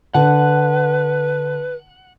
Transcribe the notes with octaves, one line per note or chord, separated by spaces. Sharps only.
D3 B4 F#5